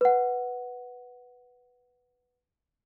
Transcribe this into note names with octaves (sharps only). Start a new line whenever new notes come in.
B4 F#5